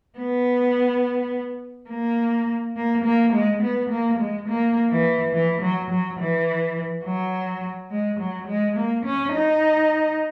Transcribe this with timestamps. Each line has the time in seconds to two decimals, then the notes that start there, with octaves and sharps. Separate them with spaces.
0.18 B3
1.90 A#3
2.76 A#3
3.04 A#3
3.33 G#3
3.62 B3
3.90 A#3
4.19 G#3
4.47 A#3
4.90 E3
5.33 E3
5.62 F#3
5.91 F#3
6.19 E3
7.05 F#3
7.91 G#3
8.19 F#3
8.48 G#3
8.76 A#3
9.06 C#4
9.33 D#4